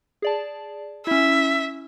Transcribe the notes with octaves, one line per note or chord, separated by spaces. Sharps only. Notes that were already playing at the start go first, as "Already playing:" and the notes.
G#4 D5 A5
C#4 E4 E5